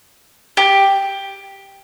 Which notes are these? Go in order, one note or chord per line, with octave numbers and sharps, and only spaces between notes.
G4